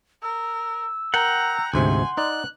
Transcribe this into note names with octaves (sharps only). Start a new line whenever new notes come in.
A#4 E6
A#4 F#5 G5 A#5
D2 G#2 C3 G#5 C6
D#4 D5 F#6